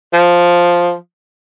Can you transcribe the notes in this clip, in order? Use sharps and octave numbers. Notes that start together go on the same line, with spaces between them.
F3